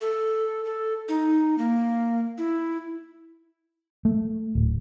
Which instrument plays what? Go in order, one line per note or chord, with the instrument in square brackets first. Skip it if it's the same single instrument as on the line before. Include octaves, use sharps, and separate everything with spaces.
[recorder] A4
A4
D#4
A#3
E4
[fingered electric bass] A3
D1